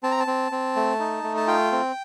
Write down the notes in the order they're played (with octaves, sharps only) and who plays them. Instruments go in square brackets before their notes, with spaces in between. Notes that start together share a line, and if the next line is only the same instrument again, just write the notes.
[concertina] C4 A5
A#5
A5
C4
C4
A3
D#4
A3
A5
F4 G5
C4